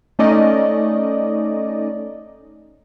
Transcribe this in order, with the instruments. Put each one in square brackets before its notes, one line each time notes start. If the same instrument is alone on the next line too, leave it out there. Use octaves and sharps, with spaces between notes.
[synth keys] A3 C#4 D#4 D5 D#5